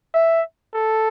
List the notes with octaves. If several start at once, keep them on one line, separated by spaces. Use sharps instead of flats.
E5
A4